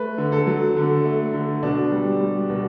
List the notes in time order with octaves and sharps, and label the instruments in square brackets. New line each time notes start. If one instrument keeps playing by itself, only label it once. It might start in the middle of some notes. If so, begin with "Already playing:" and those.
Already playing: [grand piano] A3 B4
D3
A4
F#3
D3
A3
D3
B2 D4
G3
G3
B2